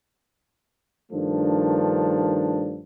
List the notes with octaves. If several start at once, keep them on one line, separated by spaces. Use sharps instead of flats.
G2 D#3 F3 A3 D4